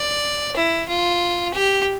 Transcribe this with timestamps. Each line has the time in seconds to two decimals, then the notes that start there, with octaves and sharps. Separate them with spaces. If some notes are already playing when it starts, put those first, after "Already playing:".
Already playing: D5
0.56 E4
0.89 F4
1.54 G4